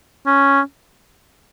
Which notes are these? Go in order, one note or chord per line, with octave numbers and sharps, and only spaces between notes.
C#4